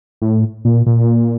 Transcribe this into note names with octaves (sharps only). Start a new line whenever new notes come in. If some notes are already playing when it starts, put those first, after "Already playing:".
A2
A#2
A#2